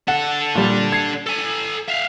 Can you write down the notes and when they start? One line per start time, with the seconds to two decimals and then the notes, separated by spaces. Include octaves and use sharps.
0.08 D4 A4 F#5
0.55 A#2 G3
0.92 G#6 C7
1.27 A4 G#5
1.89 E5 F5